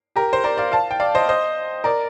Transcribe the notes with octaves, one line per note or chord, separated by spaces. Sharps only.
G4 A#4
C5
A#4 D5
D5 F5
F5 A5
G5
D5 F5
C5 D#5
C5 D#5
A#4 D5